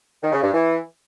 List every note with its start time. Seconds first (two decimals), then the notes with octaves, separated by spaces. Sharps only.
0.22 D#3
0.32 C#3
0.42 G2
0.53 E3